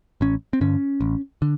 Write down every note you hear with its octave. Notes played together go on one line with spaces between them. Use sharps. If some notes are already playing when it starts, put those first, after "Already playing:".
A1 C#4
C4
G2 D3 C#4
A1
D3